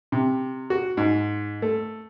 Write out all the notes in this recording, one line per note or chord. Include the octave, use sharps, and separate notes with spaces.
C3
F#4
G#2
A3